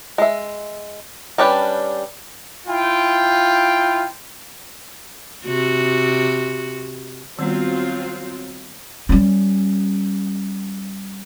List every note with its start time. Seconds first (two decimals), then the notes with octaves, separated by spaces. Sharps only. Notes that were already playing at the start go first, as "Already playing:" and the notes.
0.18 G#3 E5
1.38 G3 C#4 D4 G4 B4
2.67 E4 F4 G5
5.45 C3 F#4
7.39 D#3 F#3 G3 B3 C4 F4
9.09 G3 C#4